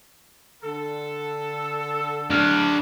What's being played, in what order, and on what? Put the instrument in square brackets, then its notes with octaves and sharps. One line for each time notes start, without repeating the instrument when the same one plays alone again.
[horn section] D3 A4
[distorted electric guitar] D4 F5